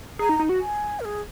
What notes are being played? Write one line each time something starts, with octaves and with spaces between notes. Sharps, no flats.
G#4 A#5
D#4
D#4
F#4
G#5
A#4
G#4